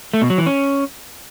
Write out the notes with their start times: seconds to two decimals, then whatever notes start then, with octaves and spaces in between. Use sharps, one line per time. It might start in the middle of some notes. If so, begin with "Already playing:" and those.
0.13 A3
0.22 B2
0.30 F#3
0.38 E3
0.46 C#4